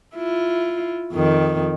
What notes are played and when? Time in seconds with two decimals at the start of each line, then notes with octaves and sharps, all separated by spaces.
0.16 E4 F4
1.12 F2 D#3